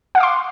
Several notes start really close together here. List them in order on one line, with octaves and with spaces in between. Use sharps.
F#5 F5 D6 C6